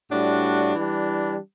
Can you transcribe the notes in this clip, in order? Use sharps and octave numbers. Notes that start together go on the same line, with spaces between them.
A2 G3 D4 F#4
E3 G3 D4